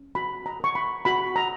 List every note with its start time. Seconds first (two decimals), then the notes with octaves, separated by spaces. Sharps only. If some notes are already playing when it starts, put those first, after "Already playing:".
Already playing: C#4
0.15 F#4 B5
0.46 A#5
0.60 A#4 C#6
0.75 B5
1.05 F#4 B5
1.36 A#5